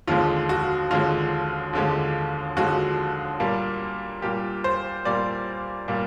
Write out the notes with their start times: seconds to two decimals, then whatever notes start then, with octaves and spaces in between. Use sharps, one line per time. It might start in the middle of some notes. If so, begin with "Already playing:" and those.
0.07 D#2 D3 F3 G#3 F4
0.49 F#4
0.91 D#2 D3 F3 G#3 F4
1.73 D#2 D3 F3 G#3
2.57 D#2 D3 F3 G#3 F#4
3.40 A#2 G3 A#3
4.22 A#2 G3 A#3 G4
4.64 C5
5.05 A#2 G3 A#3 D5
5.88 A#2 G3 A#3